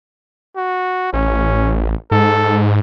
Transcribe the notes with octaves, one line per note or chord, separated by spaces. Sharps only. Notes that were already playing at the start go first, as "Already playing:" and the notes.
F#4
A1 C#4
G#2 A4